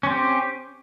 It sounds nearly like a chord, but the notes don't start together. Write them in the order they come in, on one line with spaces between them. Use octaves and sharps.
C#4 C4 G4